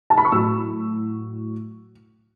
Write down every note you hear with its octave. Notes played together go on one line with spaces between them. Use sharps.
A5
B5
C#6
A2 F#3 E6